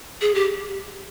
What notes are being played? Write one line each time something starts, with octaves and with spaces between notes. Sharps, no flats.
G#4
G4